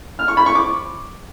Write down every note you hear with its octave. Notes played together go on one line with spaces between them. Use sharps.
F6
C#6
B5
C#6
D6